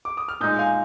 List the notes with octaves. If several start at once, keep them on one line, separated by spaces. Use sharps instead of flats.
D6
D#6
F6
A#2 G#3 D#4 D#6 G6
F5 G#5